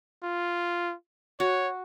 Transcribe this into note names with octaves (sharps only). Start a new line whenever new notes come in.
F4
F#4 C#5